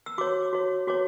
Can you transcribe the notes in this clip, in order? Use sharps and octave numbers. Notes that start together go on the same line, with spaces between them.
E6
F#4 C#5 D6
F#4 C#5
F#4 C#5 D6